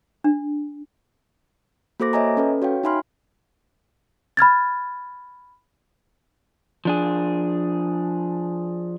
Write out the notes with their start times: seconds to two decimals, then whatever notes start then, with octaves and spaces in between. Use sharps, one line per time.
0.24 D4
2.00 A#3 F#4 A4 C5 D6 A#6
2.13 C#5 D#5 E5 G#5 A#5
2.37 C#4 A4 B4
2.62 F#4 C#5 F5 G5
2.83 D#4 E5 G#5 B5 C6 F6
4.37 B5 F6 G#6 A6
6.85 F3 D4 G#4